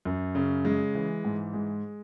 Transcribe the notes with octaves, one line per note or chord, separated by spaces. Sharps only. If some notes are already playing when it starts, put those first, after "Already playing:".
F#2
C#3
G#3
E3
G#2
G#3